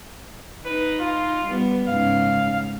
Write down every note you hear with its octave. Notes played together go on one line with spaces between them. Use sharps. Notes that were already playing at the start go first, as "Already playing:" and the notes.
D#4 B4
F4
G3 B3
G#2 C#3 F5